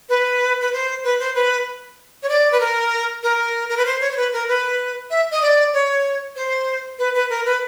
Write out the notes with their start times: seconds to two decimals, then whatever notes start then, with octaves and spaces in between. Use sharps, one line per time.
0.09 B4
0.60 B4
0.73 C5
1.04 B4
1.20 C5
1.35 B4
2.23 C#5
2.29 D5
2.52 B4
2.60 A#4
3.23 A#4
3.69 A#4
3.77 B4
3.85 C5
4.01 C#5
4.11 C5
4.17 B4
4.33 A#4
4.48 B4
5.10 E5
5.31 D#5
5.42 D5
5.73 C#5
6.36 C5
6.99 B4
7.15 B4
7.30 A#4
7.45 B4